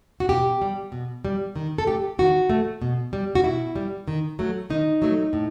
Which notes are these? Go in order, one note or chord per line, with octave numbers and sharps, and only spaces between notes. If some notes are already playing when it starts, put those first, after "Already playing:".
F#4
B2 G4
G3
B2
G3
D#3
A4
A3 G4
D#3 F#4
A3
B2
G3
F#4
B2 E4
G3
D#3
F#3 A3
D#3 D#4
F#3 A3
A2